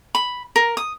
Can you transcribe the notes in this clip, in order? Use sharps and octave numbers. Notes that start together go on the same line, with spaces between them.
B5
A#4
D#6